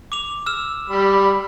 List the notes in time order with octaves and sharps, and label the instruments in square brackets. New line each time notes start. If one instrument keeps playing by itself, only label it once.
[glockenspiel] D6 F7
E6 F6 E7
[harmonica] G3 B5